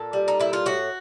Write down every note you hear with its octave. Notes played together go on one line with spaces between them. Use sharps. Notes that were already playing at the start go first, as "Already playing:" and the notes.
Already playing: A#2 A4
G3
D#4
A#2 E4
F4
A2 F#4